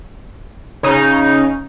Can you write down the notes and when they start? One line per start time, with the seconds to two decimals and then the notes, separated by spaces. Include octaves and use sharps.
0.83 C#3 D#4